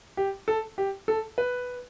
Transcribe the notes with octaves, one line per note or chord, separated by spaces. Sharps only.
G4
A4
G4
A4
B4